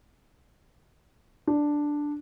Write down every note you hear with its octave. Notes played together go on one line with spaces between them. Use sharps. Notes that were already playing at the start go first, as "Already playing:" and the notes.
D4